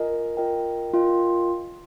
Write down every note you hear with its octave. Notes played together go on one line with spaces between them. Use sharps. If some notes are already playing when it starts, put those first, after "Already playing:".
Already playing: F4 A#4 D#5 G#5
F4 A#4 D#5 G5
F4 A#4 D#5 G5